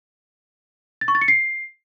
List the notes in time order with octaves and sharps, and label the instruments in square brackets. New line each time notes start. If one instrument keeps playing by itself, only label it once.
[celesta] A6
C#6
A6
C#7
C7